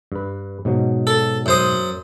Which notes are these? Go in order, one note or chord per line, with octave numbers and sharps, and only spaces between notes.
G2 B4
G#2 B2 F#3
A4
F#2 C5 D#6